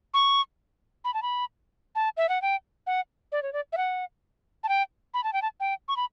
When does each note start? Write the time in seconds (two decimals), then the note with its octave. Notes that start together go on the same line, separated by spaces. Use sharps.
0.14 C#6
1.04 B5
1.14 A5
1.22 B5
1.95 A5
2.17 E5
2.29 F#5
2.42 G5
2.87 F#5
3.32 D5
3.43 C#5
3.53 D5
3.73 E5
3.77 F#5
4.64 A5
4.69 G5
5.14 B5
5.24 A5
5.33 G5
5.42 A5
5.60 G5
5.88 C#6
5.96 B5